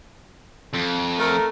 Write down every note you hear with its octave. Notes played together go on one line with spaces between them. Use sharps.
F2
A3 A#4